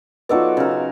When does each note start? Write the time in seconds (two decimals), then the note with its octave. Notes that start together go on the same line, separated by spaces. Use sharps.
0.29 F#3 B3 D#4 F4 A4 D5
0.57 C#3 A#4